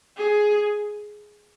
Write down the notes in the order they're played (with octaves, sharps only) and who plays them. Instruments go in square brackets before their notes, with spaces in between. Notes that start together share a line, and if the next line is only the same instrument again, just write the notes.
[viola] G#4